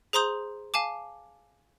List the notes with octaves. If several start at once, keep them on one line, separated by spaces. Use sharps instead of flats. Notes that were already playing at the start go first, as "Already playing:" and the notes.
G#4 C5 A#5 C6 D#6 G6
F5 G#5 A5 D6